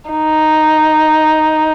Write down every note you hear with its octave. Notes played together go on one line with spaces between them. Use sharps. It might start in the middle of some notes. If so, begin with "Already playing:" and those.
D#4